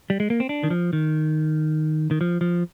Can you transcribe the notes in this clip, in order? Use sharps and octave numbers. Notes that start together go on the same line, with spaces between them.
G3
G#3
A#3
C4
D4
D#3
F3
D#3
D#3
F3
F3